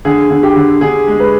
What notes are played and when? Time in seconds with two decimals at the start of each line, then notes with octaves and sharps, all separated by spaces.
0.05 D3 G#4
0.30 D3
0.43 G4
0.56 D3
0.81 D3 G#4
1.07 G#3
1.20 B4